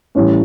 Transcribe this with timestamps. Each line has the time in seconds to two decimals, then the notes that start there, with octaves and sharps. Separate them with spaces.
0.15 A2 E3 G3 C#4 C#5